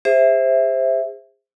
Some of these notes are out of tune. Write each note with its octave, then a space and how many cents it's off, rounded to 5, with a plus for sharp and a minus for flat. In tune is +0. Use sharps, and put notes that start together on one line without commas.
G#4 -40 C5 +0 E5 +0